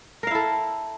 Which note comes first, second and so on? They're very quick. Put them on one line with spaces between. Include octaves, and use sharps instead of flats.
A#4 F5 E4 A4